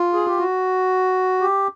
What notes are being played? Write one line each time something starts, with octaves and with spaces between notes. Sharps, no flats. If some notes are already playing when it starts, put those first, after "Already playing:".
Already playing: F4
G#4
G4
F#4
G4